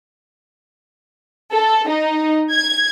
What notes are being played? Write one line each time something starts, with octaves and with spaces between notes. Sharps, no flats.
A4
D#4
G#6